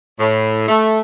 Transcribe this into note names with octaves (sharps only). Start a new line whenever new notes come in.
A2
A3